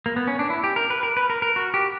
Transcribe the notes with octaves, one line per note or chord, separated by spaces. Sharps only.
A#3
B3
C#4
D4
E4
G4
A#4
B4
A#4
B4
A#4
A#4
F#4
G4